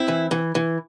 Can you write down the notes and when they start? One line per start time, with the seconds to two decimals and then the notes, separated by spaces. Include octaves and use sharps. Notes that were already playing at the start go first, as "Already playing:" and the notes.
Already playing: C4 E4
0.08 E3
0.31 E3
0.55 E3